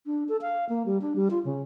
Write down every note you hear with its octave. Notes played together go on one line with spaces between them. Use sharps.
D4
A4
F5
A#3
G3
D4
G3
F4
C#3